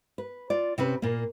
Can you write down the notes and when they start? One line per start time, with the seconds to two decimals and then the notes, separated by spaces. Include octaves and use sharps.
0.18 B4
0.50 F4 D5
0.78 C3 C4 C#4 B4
1.02 A#2 A#3